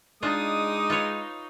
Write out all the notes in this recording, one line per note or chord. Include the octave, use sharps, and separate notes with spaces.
G#3 D4 D#4 F4 D6 D#6
F4 B4 C#5